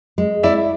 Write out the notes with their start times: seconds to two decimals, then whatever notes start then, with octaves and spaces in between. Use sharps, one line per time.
0.18 G#3
0.43 E4 D5 E5